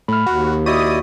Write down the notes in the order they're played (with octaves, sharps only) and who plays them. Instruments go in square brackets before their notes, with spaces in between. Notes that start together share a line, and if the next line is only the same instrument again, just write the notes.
[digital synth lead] A2 [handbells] B5 F6
[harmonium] D#2 [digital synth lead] F#4
[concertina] E4 D5 D#5 [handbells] F#4 [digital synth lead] D#6